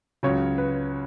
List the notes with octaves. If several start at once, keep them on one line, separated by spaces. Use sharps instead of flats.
C#2 C#3 F#3 C#5
B4